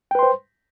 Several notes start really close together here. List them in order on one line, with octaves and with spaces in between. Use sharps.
G5 B4 C6 C5